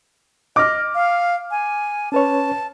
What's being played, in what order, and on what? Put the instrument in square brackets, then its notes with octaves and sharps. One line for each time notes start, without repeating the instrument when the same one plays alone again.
[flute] D#5 [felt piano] D6 F6
[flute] F5
G#5
[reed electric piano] C#4 B4 C#5 [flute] A5